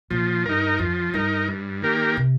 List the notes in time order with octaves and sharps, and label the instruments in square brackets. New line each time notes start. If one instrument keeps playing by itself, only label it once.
[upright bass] A#2 [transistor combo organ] F3
[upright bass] G2 [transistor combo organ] D#4 A#4
[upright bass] F2 [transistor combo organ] F3
[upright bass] G2 [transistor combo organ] D#4 A#4
[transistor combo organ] G2
D#3 A#3 G4 A#4
[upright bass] C3